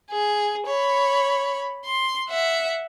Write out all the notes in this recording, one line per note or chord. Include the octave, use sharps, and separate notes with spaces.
G#4
C#5 B5
C6
E5 F#5